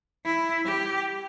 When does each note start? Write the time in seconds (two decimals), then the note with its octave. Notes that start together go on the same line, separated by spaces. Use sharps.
0.25 E4
0.66 G4